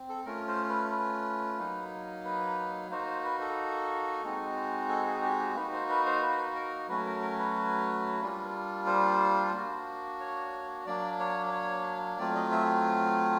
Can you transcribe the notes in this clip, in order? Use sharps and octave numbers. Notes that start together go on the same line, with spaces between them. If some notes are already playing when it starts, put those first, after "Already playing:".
Already playing: C4
A4
A3 C#4 F4 A#4
C5
B4
B4
F#3 A#3 D#4
B4
A#3 D#4 F#4 C5
C5
B4
A4
G#3 C4 D#4 F#4
A4
G#4
G4
G4
A#3 D#4 F#4 B4
C5
B4
C5
B4
A#4
F#3 A3 C#4 F#4 B4
A#4
A#4
B4
G3 A#3 D4 F4
C5
A#3 D4 F#4
C#5
F#3 A#3 D4 D5
C#5
C#5
F#3 A3 C4 F4 D5
D#5
E5